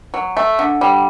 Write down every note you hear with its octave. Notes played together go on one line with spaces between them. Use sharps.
F#3
A3
D3
G3